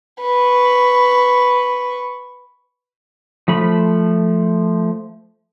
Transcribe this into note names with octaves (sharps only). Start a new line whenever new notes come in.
B4 C#6
F3 A3 B5